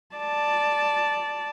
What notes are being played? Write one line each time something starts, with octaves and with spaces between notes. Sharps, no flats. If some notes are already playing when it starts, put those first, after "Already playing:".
D5 A5